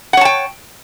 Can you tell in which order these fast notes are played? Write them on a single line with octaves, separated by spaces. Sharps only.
F#5 C#5 A5 G5